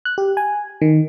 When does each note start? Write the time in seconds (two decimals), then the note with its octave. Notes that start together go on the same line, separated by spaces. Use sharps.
0.05 F#6
0.18 G4
0.37 G#5
0.82 D#3